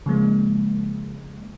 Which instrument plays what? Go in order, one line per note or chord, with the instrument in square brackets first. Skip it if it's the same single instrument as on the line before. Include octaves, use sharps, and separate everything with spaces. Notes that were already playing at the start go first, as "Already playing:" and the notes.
[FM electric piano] C#3 F3 G#3 A#3